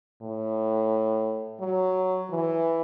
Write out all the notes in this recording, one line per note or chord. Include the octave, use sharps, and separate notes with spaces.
A2
F#3
E3